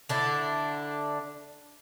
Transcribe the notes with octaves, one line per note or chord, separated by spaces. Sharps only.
D3 D4 E4